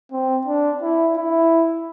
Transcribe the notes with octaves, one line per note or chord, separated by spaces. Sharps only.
C4
D4
E4
E4